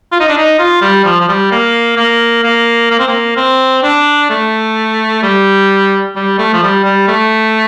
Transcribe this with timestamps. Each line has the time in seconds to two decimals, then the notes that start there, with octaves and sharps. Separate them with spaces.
0.12 F4
0.20 D#4
0.29 D4
0.37 D#4
0.59 F4
0.81 G3
1.05 F3
1.21 F3
1.28 G3
1.51 A#3
1.97 A#3
2.44 A#3
2.91 A#3
2.99 C4
3.07 A#3
3.37 C4
3.83 D4
4.30 A3
5.23 G3
6.16 G3
6.39 A3
6.53 F3
6.62 G3
6.84 G3
7.08 A3